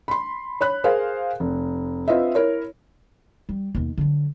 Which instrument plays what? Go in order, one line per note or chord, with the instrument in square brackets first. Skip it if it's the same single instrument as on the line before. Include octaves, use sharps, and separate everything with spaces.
[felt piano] B5 C6
C#5 B5 F#6
G#4 A#4 C5 F5
F1
C4 F4 B4 D#5 E5
E4 A#4 C#5
[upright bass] G3
D#2 B2
D3 F#3